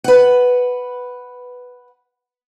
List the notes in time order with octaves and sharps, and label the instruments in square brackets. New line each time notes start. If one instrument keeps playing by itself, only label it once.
[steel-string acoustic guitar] B4 F#5